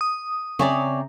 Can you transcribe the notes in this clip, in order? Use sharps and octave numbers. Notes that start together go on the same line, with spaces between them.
D#6
C#3 C4 C#5 D5 E5 G#5 A#5